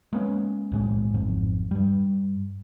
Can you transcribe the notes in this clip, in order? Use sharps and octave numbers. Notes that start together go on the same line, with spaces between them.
G#3 A#3 B3 C#4
B1 A2 G#3
D1 G#1 F2 G#2
G2 G3